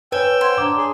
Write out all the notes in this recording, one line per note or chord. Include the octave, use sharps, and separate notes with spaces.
B4 C#5 G5 G#5 E6
C5 F#5 C6 G#6
D4 C#5 A#5 D6
G#4